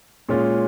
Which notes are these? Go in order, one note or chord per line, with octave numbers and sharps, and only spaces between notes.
A#2 G#3 C#4 F4